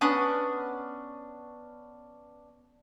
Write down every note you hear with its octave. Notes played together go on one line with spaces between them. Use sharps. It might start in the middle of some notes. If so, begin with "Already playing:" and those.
B3 C#4 D4 D#6